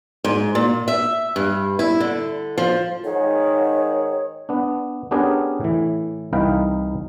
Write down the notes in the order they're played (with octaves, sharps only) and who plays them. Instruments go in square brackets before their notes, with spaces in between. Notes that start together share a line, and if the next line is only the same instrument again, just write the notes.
[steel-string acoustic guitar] G#2
A#2
E5
G2
E4
D3
F3
[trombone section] G#2 D#3 [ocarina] C#5
[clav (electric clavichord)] B3 D4
B3 C#4 D4 G4 G#4 A#4
A2 E3
C2 E3 D#4 B4 F5 G5